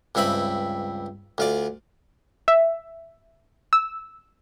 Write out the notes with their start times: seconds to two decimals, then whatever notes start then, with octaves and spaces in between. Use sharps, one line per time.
0.15 C#2 G2 C4 E5 B5
1.38 D2 F4 D5
2.48 E5
3.73 E6